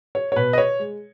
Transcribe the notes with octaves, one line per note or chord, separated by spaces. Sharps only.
C#5
C#5
B2 B4
D#5
C#5
G#3